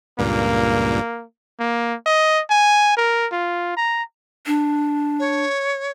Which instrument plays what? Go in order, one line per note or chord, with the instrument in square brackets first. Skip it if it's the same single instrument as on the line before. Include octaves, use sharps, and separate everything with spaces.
[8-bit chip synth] C#2 G2 A#2 [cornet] A#3
[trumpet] A#3
D#5
G#5
A#4
F4
A#5
[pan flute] D4
[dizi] C#5